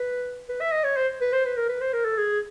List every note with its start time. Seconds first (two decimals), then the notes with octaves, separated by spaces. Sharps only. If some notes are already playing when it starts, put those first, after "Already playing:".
Already playing: B4
0.49 B4
0.61 E5
0.72 D#5
0.84 C#5
0.97 C5
1.21 B4
1.33 C5
1.45 B4
1.57 A#4
1.69 B4
1.81 C5
1.93 A#4
2.05 A4
2.17 G#4